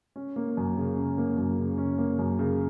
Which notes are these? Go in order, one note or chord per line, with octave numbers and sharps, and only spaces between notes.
C#4
A#3
F#2
C#3
C#4
A#3
F#2
C#3
C#4
A#3
F#2
C#3